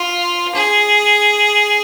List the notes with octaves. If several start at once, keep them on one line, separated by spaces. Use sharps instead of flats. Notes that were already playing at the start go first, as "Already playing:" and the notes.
Already playing: F4
G#4